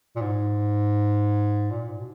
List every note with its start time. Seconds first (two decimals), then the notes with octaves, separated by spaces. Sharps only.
0.16 A#2
0.21 G#2
1.71 A#2
1.89 G#2
1.99 B2